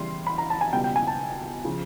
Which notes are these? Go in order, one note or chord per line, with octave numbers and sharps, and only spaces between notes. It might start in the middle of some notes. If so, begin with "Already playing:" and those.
Already playing: E2 C#3 E3 G3 C6
B5
A#5
A5
G#5
C#2 B2 G3 G5
G5
G#5
A5
C#3 F3